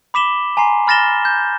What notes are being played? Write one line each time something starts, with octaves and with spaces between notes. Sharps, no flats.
B5 D6 B6 E7 F#7 G7
G#5 A#5 C6 C7
B5 F6 A6 A#6 E7 G7
G6